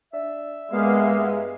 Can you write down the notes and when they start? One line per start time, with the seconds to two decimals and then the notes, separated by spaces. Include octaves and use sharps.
0.13 D4 E5
0.72 G2 G#3 A#3 B3 F5